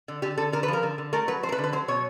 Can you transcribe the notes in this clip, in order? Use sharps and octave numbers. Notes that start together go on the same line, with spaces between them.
D3
D3 G4
D3 A4
D3 A#4
B4
F3 A#4
D3
D3
A3 A#4
F#3 B4
A3 C5
A#4
B4
D3
B4
F#3 C5
B2 C#5